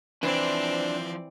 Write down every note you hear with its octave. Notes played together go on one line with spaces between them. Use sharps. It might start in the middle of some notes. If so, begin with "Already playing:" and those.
E3 F3 C4 D4 E4 C5 D5